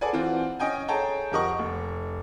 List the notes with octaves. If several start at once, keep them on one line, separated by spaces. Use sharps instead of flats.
G#4 A4 B4 D5 F#5 G#5
E3 C4 F4 F#4
C#4 D#5 G5 G#5
G#4 A4 C#5 G5 A5 A#5
F2 G4 A#4 D#5 F#5 C#6
F1